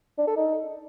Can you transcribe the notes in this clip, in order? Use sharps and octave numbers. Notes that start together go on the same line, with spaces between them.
D4
A4
D#4